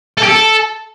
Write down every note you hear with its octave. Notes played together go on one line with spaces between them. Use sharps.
A4
G4
A4